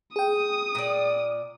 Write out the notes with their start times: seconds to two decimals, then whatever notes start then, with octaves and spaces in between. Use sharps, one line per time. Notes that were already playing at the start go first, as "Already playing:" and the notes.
0.16 G#4 G5 D#6
0.75 A#2 D5